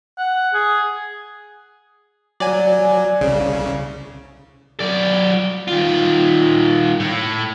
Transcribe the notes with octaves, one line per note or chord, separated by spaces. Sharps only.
F#5
G#4
F#3 D5 G#5
C2 C#3
F#3 D5
D#3 F4
A2